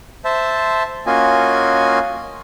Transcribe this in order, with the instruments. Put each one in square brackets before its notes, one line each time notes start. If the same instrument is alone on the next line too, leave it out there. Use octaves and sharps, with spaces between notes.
[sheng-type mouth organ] C5 E5 A5
A#3 C#4 F4 F#4 D#5 G#5